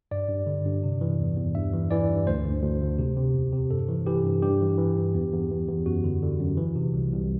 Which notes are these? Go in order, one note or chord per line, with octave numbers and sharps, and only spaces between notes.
G2 D5
G2
D3
G2
C3
E3
E2
E2
G2 E5
E3
E3 D5
G2
D2 C5
D2
D2
D2
C3
C3
E2
C3
G2 A4
E3
E3 G4
G2
G2 G4
E3
E3
G2
E2
E2
E2
E2
F#2 F#4
D3
D3
F#2
E3
C3
C2
C2